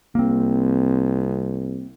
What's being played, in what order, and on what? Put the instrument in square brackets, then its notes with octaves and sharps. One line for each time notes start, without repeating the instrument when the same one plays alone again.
[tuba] C2 [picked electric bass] A#3 C4